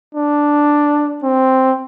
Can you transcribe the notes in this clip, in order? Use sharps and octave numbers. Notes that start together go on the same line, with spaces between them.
D4
C4